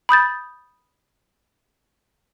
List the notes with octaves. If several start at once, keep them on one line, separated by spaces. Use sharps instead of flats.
B5 D#6 G6 A6